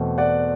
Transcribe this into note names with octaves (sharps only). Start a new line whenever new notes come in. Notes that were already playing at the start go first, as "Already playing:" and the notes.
Already playing: E2 B2 A3 C4
D5 F#5